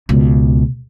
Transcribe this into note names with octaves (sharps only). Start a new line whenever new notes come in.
C#2 B2